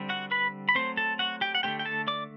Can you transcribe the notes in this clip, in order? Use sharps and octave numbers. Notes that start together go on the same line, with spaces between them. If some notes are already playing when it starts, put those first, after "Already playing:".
Already playing: D3 G3 C4
F#4 F#5
B4 B5
B5
F#3 A3 C4 C5 C6
A4 A5
F#4 F#5
G4 G5
F#5
D3 A3 C4 G4 G5
G5
A4 A5
D5 D6